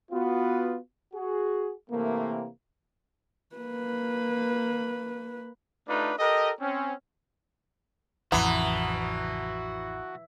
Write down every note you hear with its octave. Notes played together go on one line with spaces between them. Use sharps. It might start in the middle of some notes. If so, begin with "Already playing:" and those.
B3 F4 F#4
F#4 G#4
C3 E3 A3 A#3
A#3 B4
A3 D4 D#4 F4 B4
G4 A4 A#4 D#5
C4 C#4
A1 F2 E3 F#4 F#5 A5 A#5 D#6